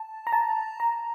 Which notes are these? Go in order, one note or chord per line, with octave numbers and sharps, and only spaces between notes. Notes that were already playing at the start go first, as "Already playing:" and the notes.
Already playing: A5
A#5
A5
A#5